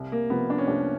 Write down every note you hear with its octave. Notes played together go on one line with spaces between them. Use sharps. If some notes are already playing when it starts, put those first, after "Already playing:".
Already playing: C2
A#3
C3 F3 B3
D4
C#4
C2 D4